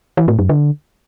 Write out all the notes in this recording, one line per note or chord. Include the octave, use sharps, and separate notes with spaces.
E3
A2
F#2
D3